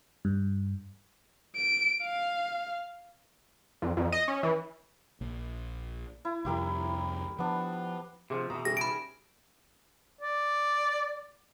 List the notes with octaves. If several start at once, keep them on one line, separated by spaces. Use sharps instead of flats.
G2
D7
F5
F2
F2
D#5
C#4
E3
A#1
E4
C2 F2 E4 G4 A#4
F3 B3 D4
C3 E3 F3 D4 G4 G#4
B2 E3 C#4 A#5 D#6
C#3 G3 G#4 A4 B4 G5 A#6
D#4 A5 B5 D7
D5